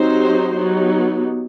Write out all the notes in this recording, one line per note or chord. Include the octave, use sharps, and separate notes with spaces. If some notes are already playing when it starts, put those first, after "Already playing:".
Already playing: F#3 C4 D#4 G4 C5
F#3 B3 D#4 G4